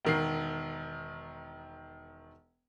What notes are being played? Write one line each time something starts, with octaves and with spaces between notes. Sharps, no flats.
E1 D#3 C7